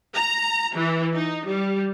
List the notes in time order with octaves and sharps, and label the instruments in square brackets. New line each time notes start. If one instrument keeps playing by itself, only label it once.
[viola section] A#5
E3
D#4
G3